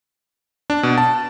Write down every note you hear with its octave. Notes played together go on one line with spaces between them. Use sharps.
D4
B2
A5